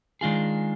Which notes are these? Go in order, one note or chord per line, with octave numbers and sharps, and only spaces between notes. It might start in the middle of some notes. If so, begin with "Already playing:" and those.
D#3 G#3 D4 F4 G#4